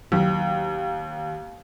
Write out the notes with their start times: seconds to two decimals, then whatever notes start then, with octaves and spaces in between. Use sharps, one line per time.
0.12 D#2 F#3